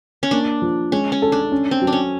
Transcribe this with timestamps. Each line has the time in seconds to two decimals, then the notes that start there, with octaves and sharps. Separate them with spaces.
0.23 C#4
0.31 A#3 D4
0.62 F3
0.91 G#3 C#4
1.12 C#4
1.22 A4
1.32 D4
1.52 C#4
1.71 C4
1.81 F#3
1.87 D4
1.93 C#4